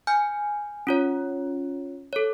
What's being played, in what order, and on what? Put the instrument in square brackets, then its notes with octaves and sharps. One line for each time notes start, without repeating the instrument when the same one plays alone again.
[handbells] G#5 F6 G6
C#4 F4 C#5
A4 C#5